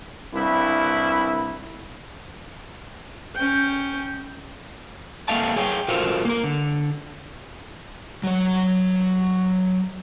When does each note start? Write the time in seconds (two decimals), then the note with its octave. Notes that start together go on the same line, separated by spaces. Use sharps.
0.34 C2 G2 E4
3.35 C#4 G5
5.28 A#3 A4 E5 F5 G5 A5
5.56 G#4 C#5 F5 G5
5.88 F4 F#4 A4 A#4 C5 F5
6.25 A#3 A#4
6.44 D3
8.24 F#3 C#5